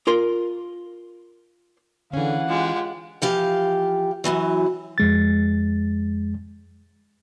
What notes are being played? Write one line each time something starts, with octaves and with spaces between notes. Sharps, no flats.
F4 A#4 C6
D3 E3 C#4 G#4 F5 F#5
G#3 F4 G4
E3 F3 G4 F5
F#2 A#2 E3 F#3
F2 G#3 A6